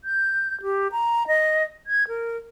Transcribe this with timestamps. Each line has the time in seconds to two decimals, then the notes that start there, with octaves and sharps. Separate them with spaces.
0.04 G6
0.62 G4
0.92 A#5
1.27 D#5
1.87 G#6
2.08 A#4